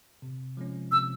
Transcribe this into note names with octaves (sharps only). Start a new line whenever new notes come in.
C3
F3 G#3 C#4
C3 E6